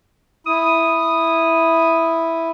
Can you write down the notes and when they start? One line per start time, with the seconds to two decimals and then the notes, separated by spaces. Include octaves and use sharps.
0.47 E4 D#6